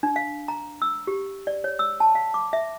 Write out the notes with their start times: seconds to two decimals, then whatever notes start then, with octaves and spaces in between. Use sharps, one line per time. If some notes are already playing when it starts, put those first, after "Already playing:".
0.03 D4
0.16 F5
0.48 A#5
0.82 E6
1.07 G4
1.47 D5
1.64 C#5
1.79 E6
2.00 A5
2.15 F5
2.34 D6
2.53 E5